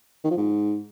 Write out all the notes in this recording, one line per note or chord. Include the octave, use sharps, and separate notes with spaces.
D#3
F3
G#2